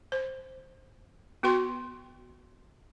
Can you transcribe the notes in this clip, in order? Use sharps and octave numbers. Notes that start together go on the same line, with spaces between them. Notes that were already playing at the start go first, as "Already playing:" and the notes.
C5
B3 F#4 B4 G5 C6